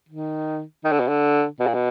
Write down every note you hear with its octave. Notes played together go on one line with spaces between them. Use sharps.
D#3
D#3
D3
B2
D3
B2
A#2
B2